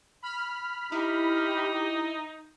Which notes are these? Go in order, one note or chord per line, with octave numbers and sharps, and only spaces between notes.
B5 F6
D#4 E4 G4